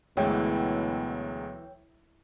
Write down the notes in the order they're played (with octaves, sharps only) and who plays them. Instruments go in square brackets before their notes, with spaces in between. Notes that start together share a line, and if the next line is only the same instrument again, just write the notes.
[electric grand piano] D2 F#3 G#3 [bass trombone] B2 [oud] E3 [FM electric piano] C#5 G5